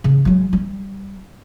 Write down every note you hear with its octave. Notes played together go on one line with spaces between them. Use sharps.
C#3
F#3 G#3
G3